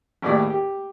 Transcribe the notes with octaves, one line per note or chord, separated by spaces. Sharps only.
G#1 D#2 A2 G4 D5 B5
G4